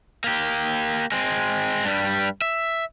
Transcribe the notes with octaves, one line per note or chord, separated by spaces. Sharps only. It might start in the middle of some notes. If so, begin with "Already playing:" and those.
A#3 G4
G#3 C4
G2 G3
E5